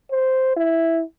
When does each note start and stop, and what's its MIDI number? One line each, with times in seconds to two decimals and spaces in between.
0.11 0.52 72
0.57 1.02 64